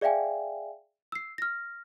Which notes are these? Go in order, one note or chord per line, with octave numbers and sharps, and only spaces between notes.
G#4 D5 E5 F5 G5 G#5
E6 C7
F6 A#6